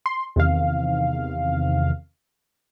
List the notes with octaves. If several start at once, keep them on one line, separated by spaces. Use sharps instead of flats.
C6
E2 C3 D#3 F5